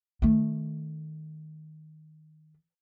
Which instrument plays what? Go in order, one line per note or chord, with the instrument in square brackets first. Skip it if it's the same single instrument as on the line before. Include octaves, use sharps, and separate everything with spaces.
[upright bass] D#3 A3